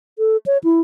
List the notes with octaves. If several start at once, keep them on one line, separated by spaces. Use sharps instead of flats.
A4
C#5
E4